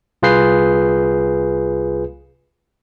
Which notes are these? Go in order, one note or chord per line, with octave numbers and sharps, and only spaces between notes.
C2 F4 G#4 B4 G6 C7